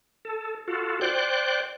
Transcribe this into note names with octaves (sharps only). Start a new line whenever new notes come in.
A4
F4 F#4 A4
C5 D5 G5 F#6